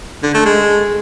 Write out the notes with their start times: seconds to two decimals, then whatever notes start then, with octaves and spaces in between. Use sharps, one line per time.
0.23 D3
0.34 A3
0.45 G#3